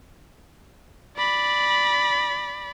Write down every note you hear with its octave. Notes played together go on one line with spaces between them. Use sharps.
D5 B5